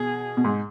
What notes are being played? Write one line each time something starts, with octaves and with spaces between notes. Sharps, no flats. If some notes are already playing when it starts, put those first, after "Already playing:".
Already playing: B2 G#4
B2
G#2